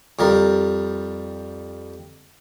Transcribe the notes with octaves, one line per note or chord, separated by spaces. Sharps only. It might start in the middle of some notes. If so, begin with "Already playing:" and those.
F2 G3 A#4